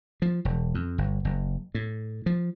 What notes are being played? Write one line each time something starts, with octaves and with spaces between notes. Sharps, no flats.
F3
E1
F2
G1
F#1
A2
F3